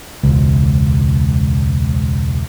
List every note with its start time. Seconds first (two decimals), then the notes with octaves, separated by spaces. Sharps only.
0.23 E1 C#2